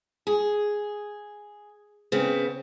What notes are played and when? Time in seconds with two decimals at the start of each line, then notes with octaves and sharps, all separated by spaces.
0.27 G#4
2.12 C#3 B3 C4